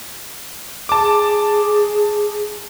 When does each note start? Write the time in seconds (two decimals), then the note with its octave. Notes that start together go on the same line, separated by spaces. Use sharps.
0.89 G#4 A5 D6